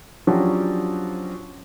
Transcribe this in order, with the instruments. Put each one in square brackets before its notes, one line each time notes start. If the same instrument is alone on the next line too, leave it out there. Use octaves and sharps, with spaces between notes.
[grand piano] F3 F#3 C#4 D4 F#4 G4